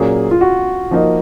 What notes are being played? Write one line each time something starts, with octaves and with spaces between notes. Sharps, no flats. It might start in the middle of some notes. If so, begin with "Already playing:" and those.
Already playing: A#2 F#3 A#3 C#4 G#4
F4
F#4
F3 A#3 D#4 A#4 D#5